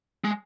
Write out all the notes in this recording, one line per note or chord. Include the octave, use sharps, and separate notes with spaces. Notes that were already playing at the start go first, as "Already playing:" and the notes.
G#3